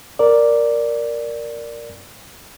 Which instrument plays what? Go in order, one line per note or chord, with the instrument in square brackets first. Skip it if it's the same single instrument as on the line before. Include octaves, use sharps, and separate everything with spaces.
[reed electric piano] A#4 D5